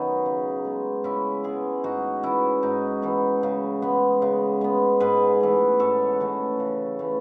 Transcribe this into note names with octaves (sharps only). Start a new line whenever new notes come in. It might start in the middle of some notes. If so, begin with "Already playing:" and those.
Already playing: D#3 F#3 B3 C#4 D#4
C#3
G#3 B3
C#3 C#4 E4
G#3 B3 E4 G#4
G#2 D#4 F#4
E3 B3 C#4 E4
G#2 D#4
E3 B3
C#3
G#3 B3
C#3
G#3 B3
G#2 G#4 B4
E3 A3 C#4
G#2 A4 C#5
E3 A3 C#4
C#3
E3 A3 C#4